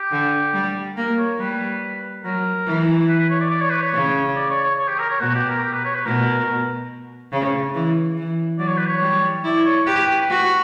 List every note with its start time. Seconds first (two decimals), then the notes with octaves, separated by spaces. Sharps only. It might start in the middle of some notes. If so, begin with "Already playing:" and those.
Already playing: G4
0.12 D3
0.54 G3
0.96 A#3 A#4
1.18 C#5
1.39 G3 B4
2.24 F#3 A#4
2.66 E3
3.08 B4
3.19 B4
3.29 C#5
3.40 D5
3.51 D5
3.61 C#5
3.70 B4
3.81 C#5
3.93 C#3
4.36 D5
4.50 C#5
4.64 C#5
4.78 C#5
4.88 G4
4.99 A#4
5.10 C#5
5.21 B2 F#4
5.35 G4
5.49 A#4
5.63 G4
5.73 B4
5.84 C#5
5.95 B4
6.05 B2 A#4
7.32 C#3
7.75 E3
8.17 E3
8.59 F#3 D5
8.68 C#5
8.77 B4
8.86 C#5
9.02 G3
9.44 E4 D5
9.66 C#5
9.87 G4 B4
10.30 F#4